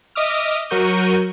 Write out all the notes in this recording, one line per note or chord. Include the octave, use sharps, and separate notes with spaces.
D#5 E5 D6 D#6 F6
F#3 F#4 A#4 C#6 G6 D#7